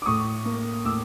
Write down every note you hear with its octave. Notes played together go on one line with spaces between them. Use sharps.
D6
A2 C#6 D#6
A#3
A2 D6 E6